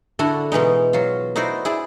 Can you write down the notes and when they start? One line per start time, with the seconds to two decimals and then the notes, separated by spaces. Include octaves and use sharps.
0.19 D3 D4 E4 F#4 A4
0.52 B2 E3 G#3 D#4
0.93 F#3 F4
1.36 D#4 E4 F#4 C5 D5
1.65 E4 G#4 D5